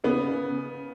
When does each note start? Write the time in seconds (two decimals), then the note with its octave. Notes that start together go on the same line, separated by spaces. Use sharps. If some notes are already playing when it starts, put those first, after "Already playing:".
0.04 C#3 B3
0.30 C#3